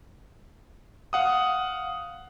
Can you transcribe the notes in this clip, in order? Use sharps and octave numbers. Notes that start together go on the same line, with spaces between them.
F5 F#5 D#6